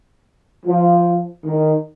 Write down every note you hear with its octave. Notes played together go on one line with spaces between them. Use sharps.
F3
D#3